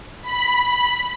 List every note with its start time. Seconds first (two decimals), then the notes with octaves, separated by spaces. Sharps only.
0.22 B5